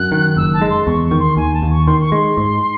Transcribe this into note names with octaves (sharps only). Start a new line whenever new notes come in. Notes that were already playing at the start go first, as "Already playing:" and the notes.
Already playing: F#2 F#6
D#3
F#1 E6
A5
G#3
C6
E2 C#6
C#6
D#3
C6
D#2 G#5
A5
D#2
C#6
D#3 C6
C#6
G#3 C6
G#2